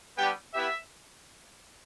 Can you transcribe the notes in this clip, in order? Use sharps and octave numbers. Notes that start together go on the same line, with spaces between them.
G3 B3 D4 G4 G5
B3 E4 G4 E5